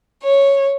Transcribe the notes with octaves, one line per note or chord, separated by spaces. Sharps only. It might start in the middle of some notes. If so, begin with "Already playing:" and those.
C#5